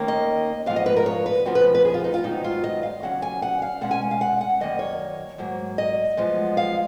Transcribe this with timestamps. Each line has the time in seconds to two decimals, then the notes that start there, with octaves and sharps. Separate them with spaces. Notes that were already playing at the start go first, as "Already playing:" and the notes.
Already playing: D#2 D#3 A#3 C#4
0.08 D#5
0.66 G#2 F3 B3 F5
0.76 D#5
0.86 B4
0.96 A#4
1.06 C#5
1.26 B4
1.45 F2 C#3 F3 B3 F#4
1.55 B4
1.75 B4
1.85 G#4
1.94 F4
2.04 D#4
2.14 F4
2.24 G#2 D#3 F#3 B3 D#4
2.44 F4
2.64 D#5
2.83 F5
3.02 D#2 C#3 F#3 C#4 F#5
3.22 G#5
3.42 F#5
3.62 F5
3.81 B2 G#3 C#4 F#5
3.91 G#5
4.11 F5
4.21 F#5
4.41 F#5
4.60 F#2 D#3 A#3 D#5
4.79 C#5
5.38 G#2 F#3 A#3
5.78 D#5
6.17 F#2 F3 G#3 B3
6.57 F5